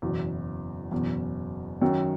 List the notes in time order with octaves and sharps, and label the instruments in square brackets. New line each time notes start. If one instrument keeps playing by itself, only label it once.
[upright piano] F#1 E2 B2 F#3
F#1 E2 B2
F#2 D#3 F#3 C#4